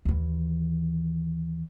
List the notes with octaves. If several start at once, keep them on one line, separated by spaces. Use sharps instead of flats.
D#2 E3